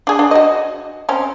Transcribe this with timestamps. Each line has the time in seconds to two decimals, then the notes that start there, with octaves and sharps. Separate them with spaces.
0.07 D4 G#4
0.19 D4
0.31 F#4 D#5
1.09 C4 C#4